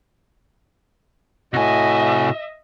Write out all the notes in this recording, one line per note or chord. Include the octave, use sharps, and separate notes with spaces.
A2 C3 F#4 D#5 E5 G#5